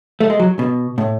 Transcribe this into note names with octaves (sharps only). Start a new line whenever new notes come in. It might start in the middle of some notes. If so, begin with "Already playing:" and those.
A3
G#3
F#3
B2
A2